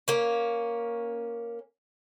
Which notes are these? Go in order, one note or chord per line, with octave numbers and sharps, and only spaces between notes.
A#3 C#4